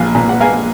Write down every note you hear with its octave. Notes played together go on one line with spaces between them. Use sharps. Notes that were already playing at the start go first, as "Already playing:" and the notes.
Already playing: A#1 A#2 F5 G#5
A#2
F#5
A#3 F5 G#5